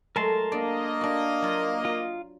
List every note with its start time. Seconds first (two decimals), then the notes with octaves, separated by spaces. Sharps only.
0.16 F#3 G#3 A3 A#4 A5 C6
0.52 A#3 D4 D5 D#5
1.01 D4 F#4
1.42 F#3 F4
1.85 F4 A#5